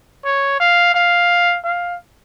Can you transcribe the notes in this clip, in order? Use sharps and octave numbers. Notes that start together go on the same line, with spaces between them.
C#5
F5
F5
F5